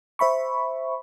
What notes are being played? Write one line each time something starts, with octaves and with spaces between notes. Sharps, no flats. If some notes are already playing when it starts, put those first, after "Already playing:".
C5 E5 B5 C#6